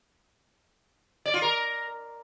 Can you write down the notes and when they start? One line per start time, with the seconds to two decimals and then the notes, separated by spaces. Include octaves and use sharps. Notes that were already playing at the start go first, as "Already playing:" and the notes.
1.26 D5
1.34 F4
1.42 A#4